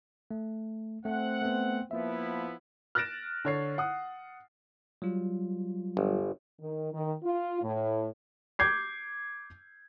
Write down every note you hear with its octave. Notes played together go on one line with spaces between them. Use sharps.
A3
A3 C4 F#5
A3 B3
F3 A#3 B3 E4 E5
F6 F#6 A6 A#6 D7 E7
D3 C#5 C7
F#5 D#6
F#3 G3 F4
G1
D#3
D#3
F4
A2
D6 G6 G#6 C7